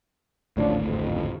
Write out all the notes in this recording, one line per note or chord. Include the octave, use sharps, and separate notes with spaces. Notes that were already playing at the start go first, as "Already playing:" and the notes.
G#1 D2 A2 F3 C#4 D4
F2